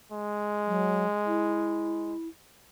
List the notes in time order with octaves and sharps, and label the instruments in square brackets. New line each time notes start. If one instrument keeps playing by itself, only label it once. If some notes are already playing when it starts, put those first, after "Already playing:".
[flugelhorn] G#3
[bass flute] F#3
E4